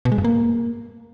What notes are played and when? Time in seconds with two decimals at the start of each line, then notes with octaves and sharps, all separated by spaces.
0.05 B2
0.12 G#3
0.18 G2
0.25 A#3